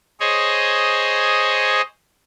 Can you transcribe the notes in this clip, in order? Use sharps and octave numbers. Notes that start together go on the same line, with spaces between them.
G#4 C5 C#5 D#5